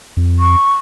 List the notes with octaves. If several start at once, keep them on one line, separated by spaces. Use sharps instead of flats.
F2
C#6